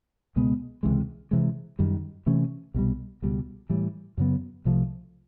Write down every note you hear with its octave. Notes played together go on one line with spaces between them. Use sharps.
C#2 B2 G#3 B3
C#2 C3 E3 G#3
C3 E3 G#3
F#2 D#3 G3
C3 E3 A3 C#4
C2 B2 G3
C#2 B2 G3
A2 E3 G3
F#2 C#3 F#3 B3
C2 C3 F3 A3